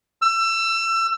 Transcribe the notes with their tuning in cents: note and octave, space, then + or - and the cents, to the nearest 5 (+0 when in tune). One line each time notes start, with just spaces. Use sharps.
E6 +25